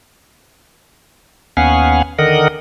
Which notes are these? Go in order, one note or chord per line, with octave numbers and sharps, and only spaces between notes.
D#2 B3 C#4 F5 F#5 G#5
D3 D#3 A#4 D#5 F#5